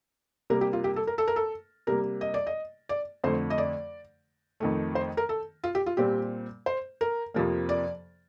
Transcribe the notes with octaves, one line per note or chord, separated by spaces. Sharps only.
C3 G3 A#3 A#4
G4
F4
G4
A4
A#4
A4
A#4
A4
C3 G3 A#3 A#4
D#5
D5
D#5
D5
F2 D3 A3 C5
D#5
D5
F2 D#3 A3
C5
A#4
A4
F4
G4
F4
A#2 G3 C4 G4
C5
A#4
F2 C3 F3 A#3
D5